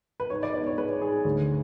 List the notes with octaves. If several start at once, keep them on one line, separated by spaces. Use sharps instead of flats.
B4
G#2 C#5
D5
B3 D5
C#5
G#3 B4
G#2 G#4
D2